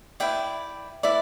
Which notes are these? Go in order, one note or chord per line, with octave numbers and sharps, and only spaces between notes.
E4 B4 D5 G5
E4 B4 D5